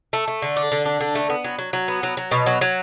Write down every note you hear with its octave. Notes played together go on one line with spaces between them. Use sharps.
A3
A3
D3
D4
D3
D4
D3
A3
B3
F#3
F#3
F#3
B3
F#3
F#3
B2
F#3
F#3